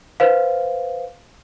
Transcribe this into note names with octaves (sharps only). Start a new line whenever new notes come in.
B4 C5 F5